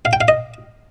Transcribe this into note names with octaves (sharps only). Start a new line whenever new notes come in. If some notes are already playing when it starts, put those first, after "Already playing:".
F5
G5
F5
D#5